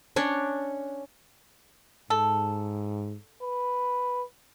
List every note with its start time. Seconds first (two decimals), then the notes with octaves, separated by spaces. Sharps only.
0.16 C#4 D4 C#5
2.10 G#2 A4
3.42 B4